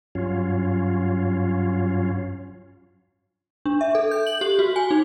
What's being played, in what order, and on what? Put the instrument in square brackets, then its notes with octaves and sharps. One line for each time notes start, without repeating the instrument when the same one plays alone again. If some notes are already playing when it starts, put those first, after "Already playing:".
[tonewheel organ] G2 F#3 C#4 F4
[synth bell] D4
E5
A4
G6
F#7
G4
F#4
G#5
D#4